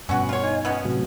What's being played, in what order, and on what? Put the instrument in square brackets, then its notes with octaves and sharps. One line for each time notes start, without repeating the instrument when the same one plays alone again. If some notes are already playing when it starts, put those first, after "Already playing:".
[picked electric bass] G2 B2 [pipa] C#4 F#4 B4
[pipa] F4 C#5
[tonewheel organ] D#4 G#5
[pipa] F3 B3 C#4
[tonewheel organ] A2 C3 F#3